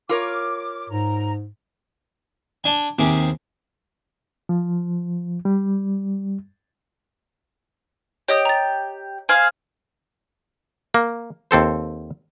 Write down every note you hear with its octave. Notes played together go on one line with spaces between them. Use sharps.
F4 A#4 C#5 D6
G#2 A#5
D4 G#5
D#2 C3 G#4 D6
F3
G3
G4 C#5 D#5 D#6
A#5 A6
G#4 C5 F5
A#3
D#2 C4 A4 C5